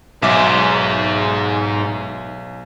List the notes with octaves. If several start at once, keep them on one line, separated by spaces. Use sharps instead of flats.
B1 G#2 E5 D6